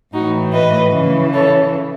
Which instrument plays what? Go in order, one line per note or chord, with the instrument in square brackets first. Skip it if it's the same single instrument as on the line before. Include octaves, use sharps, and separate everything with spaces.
[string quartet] A2 E3 D#4 F#4
B4 D#5
C#3 E3
A4 C#5